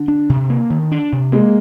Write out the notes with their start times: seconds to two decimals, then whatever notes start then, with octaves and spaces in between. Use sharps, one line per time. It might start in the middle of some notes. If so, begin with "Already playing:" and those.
Already playing: D3
0.08 D4
0.29 C3
0.50 A#3
0.70 D#3
0.92 D4
1.12 C3
1.32 G#3 A#3